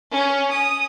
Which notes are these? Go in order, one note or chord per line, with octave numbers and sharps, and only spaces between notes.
C#4
D#6